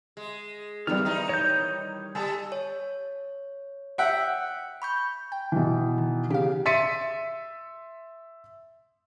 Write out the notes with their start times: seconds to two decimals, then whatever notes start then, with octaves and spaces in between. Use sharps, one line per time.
0.17 G#3
0.87 E2 G2 D#3 G3 F6
1.05 E3 D#4
1.29 C#5 G6
2.15 G3 A4 G#5 A5
2.52 C#5
3.98 E5 F#5 G5
4.82 B5 C#6 G6
5.32 G5
5.52 B2 E3
5.98 D#3
6.30 C#3 G4 F5
6.66 E5 C6 A6 B6 C#7 D#7